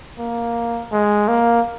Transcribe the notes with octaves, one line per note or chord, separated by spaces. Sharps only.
A#3
G#3
A#3